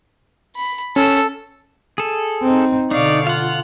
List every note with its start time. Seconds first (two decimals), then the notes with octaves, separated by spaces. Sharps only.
0.56 B5
0.96 C#4 A4 E6
1.98 G#4 A4
2.42 C4 D#4
2.91 B2 D3 D#4 D5 F5 C#6
3.27 F4 F5 F#5